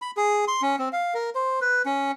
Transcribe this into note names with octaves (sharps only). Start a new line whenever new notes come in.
B5
G#4
C6
C#4
C4
F5
A#4
C5
B4
C#4